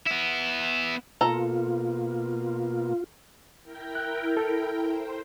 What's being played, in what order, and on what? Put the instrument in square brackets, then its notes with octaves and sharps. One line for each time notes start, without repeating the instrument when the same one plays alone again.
[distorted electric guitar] B3 E4
[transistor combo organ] B2 A#3 [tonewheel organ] F4 [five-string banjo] A4 A#5
[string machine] E4 A#4 G5
[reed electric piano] F#6
A4
[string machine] C5